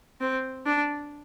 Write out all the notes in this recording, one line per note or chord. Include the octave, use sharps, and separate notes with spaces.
C4
D4